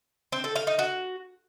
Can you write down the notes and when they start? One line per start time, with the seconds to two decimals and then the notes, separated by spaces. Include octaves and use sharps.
0.32 C4
0.44 A4
0.56 F5
0.67 D#4
0.79 F#4